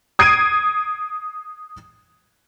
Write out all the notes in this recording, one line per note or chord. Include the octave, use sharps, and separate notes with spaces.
D#6 G#6 C7 D7 D#7